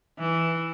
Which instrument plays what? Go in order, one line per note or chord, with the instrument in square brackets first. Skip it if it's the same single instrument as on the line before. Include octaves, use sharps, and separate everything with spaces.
[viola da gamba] E3